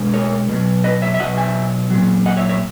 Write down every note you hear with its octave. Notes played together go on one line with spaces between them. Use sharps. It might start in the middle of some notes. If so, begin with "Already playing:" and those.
Already playing: B2 G#3
A#4 C#5
B2 F#3
B4 D#5
C#5 E5
E5
B2 F#3 D#5 F#5
E5 G#5
A#2 F#3
D#5 F#5
C#5 E5
C#5 E5